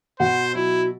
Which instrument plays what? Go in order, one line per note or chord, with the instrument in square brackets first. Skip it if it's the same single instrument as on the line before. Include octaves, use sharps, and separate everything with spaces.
[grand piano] B2 [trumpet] C5 [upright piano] F#5
[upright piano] F#3 [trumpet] E4